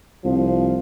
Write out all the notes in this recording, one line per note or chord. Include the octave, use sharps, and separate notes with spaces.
C2 F3